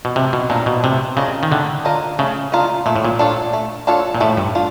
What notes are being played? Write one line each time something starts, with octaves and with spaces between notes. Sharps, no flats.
B2
C3 A3
B2
A#2 D4 F4 A#4 D#5
B2
C3 A3
C#3 D4 F4 A#4 D#5
D#3
D3 A3
D4 F4 A#4 D#5
C#3 A3
D4 F4 A#4 D#5
A#2 A3
A2
A#2
D4 F4 A4 C#5
A3
D4 F4 A4 C#5
A#2
A2 A3
G2
D4 F4